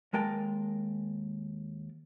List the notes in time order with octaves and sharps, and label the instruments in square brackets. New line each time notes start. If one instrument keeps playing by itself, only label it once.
[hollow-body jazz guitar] D#2 G#3 A#4 G5 A5